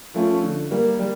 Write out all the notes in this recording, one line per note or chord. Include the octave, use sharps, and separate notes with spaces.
F3 A3 C#4 F4
D3
G3 A#3
G3